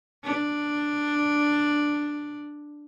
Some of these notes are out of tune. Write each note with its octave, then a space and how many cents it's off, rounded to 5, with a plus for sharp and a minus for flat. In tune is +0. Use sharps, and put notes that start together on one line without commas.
D4 +5